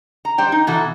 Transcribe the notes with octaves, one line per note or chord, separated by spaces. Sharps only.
A#5
G3 C5 G5
D#4
B2 E3 F#4 A4